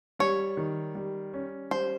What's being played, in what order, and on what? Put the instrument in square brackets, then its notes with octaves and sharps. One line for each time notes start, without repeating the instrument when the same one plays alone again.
[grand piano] G3 [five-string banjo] C#5
[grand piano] D#3
G3
C#4
[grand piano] G3 [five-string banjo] C5